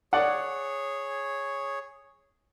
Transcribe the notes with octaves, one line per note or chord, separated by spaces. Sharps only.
G#4 C#5 D5 F#5